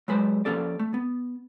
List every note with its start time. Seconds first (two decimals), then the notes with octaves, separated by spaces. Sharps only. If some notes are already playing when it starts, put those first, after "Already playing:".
0.08 F#3 G#3 B4 C5
0.45 F3 F#3 A#3 C#4 A4 D5
0.79 A3
0.94 B3